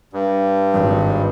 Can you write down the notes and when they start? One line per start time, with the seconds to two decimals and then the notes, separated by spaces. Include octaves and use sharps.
0.13 G2
0.73 G#1